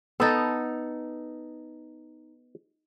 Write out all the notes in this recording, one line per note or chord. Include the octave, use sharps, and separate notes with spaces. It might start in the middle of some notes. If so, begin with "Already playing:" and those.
B3 D#4 A4 A5